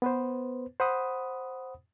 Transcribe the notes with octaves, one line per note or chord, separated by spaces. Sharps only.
B3 B4 C5
C5 F#5 B5 D#6